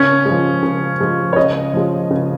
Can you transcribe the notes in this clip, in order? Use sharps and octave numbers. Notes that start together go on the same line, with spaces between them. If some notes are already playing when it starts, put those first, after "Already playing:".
Already playing: C#3 C#4
F3 G#3
C#3
F3 G#3
C#5
C#3 D#5
F3 G#3
C#3